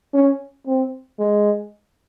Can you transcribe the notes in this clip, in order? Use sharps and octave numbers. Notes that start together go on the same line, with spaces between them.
C#4
C4
G#3